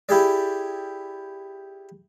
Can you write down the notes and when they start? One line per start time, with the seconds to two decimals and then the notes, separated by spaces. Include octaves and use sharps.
0.09 E4 G4 G#4 D5